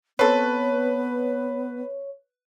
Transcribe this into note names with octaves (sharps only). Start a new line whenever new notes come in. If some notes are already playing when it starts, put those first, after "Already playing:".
B3 C4 A4 B4 C#5